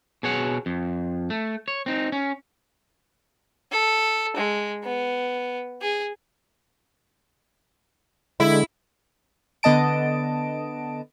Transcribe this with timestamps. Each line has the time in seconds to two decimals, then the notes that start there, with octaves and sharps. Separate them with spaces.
0.23 B2 G#4 C#5 F#5
0.66 F2
1.30 A3
1.68 C#5
1.86 C4 D#4
2.12 C#4
3.71 A4
4.36 G#3
4.84 B3
5.81 G#4
8.40 D3 G#3 E4
9.63 D3 B3 D#5 A5 D7